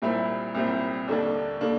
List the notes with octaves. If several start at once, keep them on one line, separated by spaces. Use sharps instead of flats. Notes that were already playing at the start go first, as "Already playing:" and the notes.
C2 A#2 G3 C4 E4
C2 A#2 G3 C4 E4
D#2 D3 G3 A#3 D4
D3 G3 A#3 D4